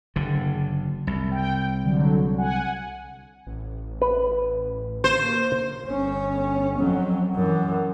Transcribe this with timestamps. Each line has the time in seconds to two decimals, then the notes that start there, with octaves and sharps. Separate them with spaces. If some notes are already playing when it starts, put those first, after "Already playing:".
0.16 F#1 D3
1.07 C2
1.32 G5
1.84 D3 F#3
2.38 F#5 G#5
3.47 A1
4.02 B4
5.04 A#3 C5
5.87 G1 C#4
6.79 F2 F#3
7.35 F#2 E3